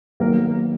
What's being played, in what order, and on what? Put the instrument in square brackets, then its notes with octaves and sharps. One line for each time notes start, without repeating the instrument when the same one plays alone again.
[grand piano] D#3 F#3 A#3 B3 A#4